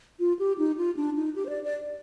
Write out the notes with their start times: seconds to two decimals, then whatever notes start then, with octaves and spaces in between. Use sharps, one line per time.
0.20 F4
0.39 G4
0.58 D#4
0.77 F4
0.97 D4
1.16 D#4
1.36 G4
1.46 C5
1.49 D5
1.64 D5